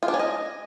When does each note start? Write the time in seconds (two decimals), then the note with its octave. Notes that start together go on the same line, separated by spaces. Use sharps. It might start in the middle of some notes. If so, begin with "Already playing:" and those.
0.03 F4
0.08 D4
0.14 C#4
0.19 D#5